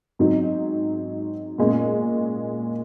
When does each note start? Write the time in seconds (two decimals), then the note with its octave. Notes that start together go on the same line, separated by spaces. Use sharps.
0.19 G#2 F#3 C4 D#4
1.58 A#2 G#3 C#4